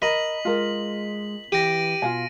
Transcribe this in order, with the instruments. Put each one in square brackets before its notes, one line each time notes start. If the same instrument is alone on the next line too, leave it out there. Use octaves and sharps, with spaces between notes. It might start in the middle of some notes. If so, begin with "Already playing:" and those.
[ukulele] A#4 A#5 B5 [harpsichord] D#5 [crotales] B6 F#7
[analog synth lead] G#3 [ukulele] F4 A#4
[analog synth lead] E3 [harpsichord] G4 [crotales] A#6 D7 D#7
[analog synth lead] B2 [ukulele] F4 F5 G#5